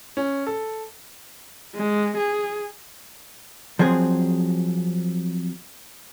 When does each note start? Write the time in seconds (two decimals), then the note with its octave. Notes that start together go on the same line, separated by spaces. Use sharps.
0.17 C#4
0.47 A4
1.75 G#3
2.17 G#4
3.79 F3 F#3 C4 G#4